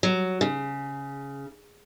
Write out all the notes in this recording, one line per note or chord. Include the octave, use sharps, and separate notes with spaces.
F#3
C#3